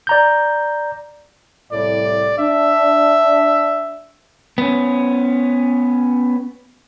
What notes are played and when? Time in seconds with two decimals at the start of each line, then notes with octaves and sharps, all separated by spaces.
0.07 D5 A#5 G6
1.72 C2 A2 D5
2.38 D4 E5
4.58 B3 C#4